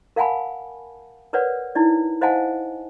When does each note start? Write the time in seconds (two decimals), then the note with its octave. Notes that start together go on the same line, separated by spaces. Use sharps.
0.16 A#4 F5 F#5 G#5 A5 B5
1.33 A#4 B4 C#5 D5 F#5
1.75 D#4 E4 D5
2.21 C5 D#5 F5 F#5 G#5 A5